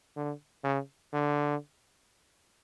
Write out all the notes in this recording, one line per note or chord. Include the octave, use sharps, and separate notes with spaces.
D3
C#3
D3